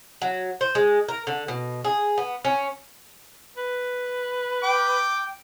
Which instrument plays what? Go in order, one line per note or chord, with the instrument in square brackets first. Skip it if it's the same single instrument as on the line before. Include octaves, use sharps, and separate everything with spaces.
[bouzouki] F#3
C5
G#3
A#4
D3
B2
G#4
B3
C#4
[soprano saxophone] B4
[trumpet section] G5 D6